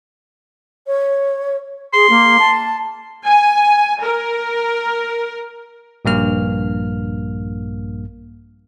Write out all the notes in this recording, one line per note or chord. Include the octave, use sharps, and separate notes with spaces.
C#5
G#4 C6
A#3
A5
G#5
A#4
A#1 G2 A#3 F6